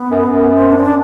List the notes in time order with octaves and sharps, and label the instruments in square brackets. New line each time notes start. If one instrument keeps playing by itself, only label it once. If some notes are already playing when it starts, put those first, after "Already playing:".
Already playing: [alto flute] B3
[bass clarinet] F#2
F#2
[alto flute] C4
D4
C4
D4